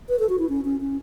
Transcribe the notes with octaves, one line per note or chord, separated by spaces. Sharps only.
B4
A4
F#4
E4
C#4
C#4
C#4